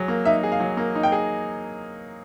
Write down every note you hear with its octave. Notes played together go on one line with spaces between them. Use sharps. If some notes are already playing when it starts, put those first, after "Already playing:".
Already playing: F#3 G#4
A#3
D#4 E5
G#4
F5
F#3
A#3
D#4
G5
G#4